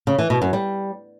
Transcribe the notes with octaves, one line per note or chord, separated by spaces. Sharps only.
C#3
E3
B2
F#2
G3